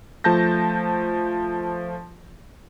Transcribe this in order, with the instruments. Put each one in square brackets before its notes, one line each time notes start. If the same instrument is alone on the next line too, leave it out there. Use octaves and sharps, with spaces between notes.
[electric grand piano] F3 A3 A5 G6 A#6